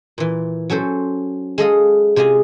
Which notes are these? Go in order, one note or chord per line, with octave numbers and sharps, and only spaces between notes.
A#2 E3
F#3 C#4 A4 C5
G#3 A4 D#5 F5
C3 G#3 F4 G#4 G#5